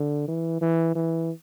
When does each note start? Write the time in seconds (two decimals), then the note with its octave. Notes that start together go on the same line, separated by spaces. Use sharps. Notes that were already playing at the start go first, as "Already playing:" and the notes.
Already playing: D3
0.28 E3
0.61 E3
0.95 E3